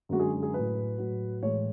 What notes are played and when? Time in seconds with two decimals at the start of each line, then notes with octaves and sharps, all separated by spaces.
0.09 F#2 D3 G#3 F#4
0.20 G#4
0.43 G#4
0.53 A2 F#3 B4
0.98 A2 F#3
1.42 A2 E3 G#3 C#5